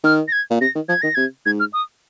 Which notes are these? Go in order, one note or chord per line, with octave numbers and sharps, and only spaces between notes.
D#3 F6
A#6
G#6
A#2
C3 A#6
D#3
F3 G#6
D#3 A#6
C3 G#6
G#2 G#6
F6
D#6